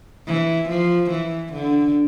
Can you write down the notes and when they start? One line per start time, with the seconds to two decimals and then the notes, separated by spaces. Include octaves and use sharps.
0.27 E3
0.69 F3
1.11 E3
1.53 D3